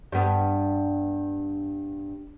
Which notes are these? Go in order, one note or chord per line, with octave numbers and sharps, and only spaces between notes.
G2 B3